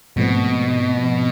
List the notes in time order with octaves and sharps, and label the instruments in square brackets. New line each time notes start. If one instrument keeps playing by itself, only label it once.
[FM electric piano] G#2 F3 A3 C4 [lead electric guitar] B2